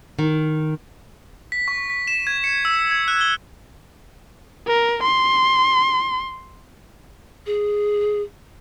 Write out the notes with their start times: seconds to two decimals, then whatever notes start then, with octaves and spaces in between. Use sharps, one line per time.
0.19 D#3
1.52 B6
1.68 C#6
1.90 B6
2.08 E7
2.27 G#6
2.44 C#7
2.65 E6
2.91 G#6
3.08 F#6
3.21 G7
4.67 A#4
5.03 C6
7.46 G#4